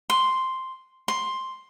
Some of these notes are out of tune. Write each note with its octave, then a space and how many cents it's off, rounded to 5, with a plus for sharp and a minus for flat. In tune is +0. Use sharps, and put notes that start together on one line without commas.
C6 +0
C6 +5